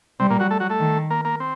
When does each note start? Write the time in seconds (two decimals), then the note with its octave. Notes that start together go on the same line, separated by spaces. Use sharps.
0.20 C3 G3 C4
0.30 A#2 A#3
0.40 F#3 F#4
0.51 A3 A4
0.60 F#3 F#4
0.70 A3 A4
0.80 D#3
1.10 A#3 A#4
1.25 A#3 A#4
1.40 C4